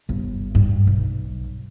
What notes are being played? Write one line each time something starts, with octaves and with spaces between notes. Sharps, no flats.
G1
G2
B1